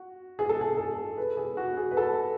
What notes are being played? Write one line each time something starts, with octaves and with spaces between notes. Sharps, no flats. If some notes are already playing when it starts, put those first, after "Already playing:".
Already playing: F#4
G#4
A4
G#4
A4
B4
G#4
F#4
G#4
B4
A4